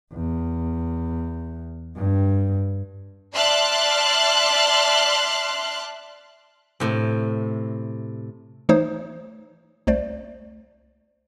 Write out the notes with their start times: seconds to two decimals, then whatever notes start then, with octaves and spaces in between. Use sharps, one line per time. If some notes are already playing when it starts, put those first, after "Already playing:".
0.13 E2
1.96 G2
3.34 D5 E5 A5 C6 F6 F#6
6.80 A2 C3
8.69 E3 A3 D#4 C5 C#5 D#6
9.87 C2 A3 C5 D5